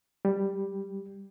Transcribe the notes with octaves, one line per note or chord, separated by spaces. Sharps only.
G3